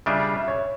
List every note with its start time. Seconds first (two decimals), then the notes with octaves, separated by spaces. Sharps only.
0.06 C#3 G3 D4 F4 E5
0.34 E5
0.48 C#5